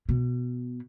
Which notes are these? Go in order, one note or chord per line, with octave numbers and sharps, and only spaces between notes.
B2